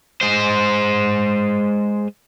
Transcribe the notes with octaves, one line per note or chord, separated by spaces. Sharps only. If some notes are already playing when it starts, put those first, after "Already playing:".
G#3 C5